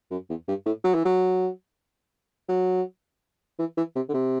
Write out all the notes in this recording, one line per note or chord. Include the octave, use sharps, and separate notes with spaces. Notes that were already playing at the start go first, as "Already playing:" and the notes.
F#2
E2
G2
A2
F#3
E3
F#3
F#3
E3
E3
C3
D3
C3